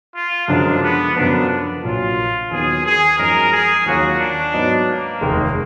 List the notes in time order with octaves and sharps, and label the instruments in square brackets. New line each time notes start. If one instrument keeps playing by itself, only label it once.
[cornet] F4
[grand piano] F#2 D3 F3 G#3 [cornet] D4
[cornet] B3
[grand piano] F#2 D3 F3 B3 [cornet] D4
[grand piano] A#1 A#2 F#3 [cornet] F4
[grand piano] D#2 D#3 F#3 B3 [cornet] G#4
[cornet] G#4
[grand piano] F#2 F3 G#3 D#4 [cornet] A#4
[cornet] G#4
[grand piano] D#2 D#3 F#3 A#3 F4 [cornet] F#4
[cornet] D4
[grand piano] G#2 F#3 B3 D#4
[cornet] A#3
[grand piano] F1 D#2 D#3 G#3